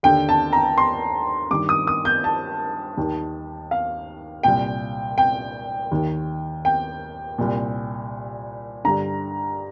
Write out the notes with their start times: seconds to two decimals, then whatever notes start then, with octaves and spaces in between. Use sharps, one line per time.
0.03 D#2 D3 G5
0.29 A5
0.53 A#5
0.78 C6
1.51 G2 D#3 D6
1.69 D#6
1.87 D#6
2.05 G6
2.24 A5
2.97 D#2 D#3
3.71 F5
4.43 C2 A#2 G5
5.18 G5
5.91 D#2 D#3
6.65 G5
7.38 C2 A#2
8.85 G2 D3 A#5